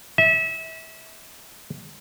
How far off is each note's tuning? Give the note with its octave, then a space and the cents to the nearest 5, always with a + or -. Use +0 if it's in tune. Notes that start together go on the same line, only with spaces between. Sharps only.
E5 -30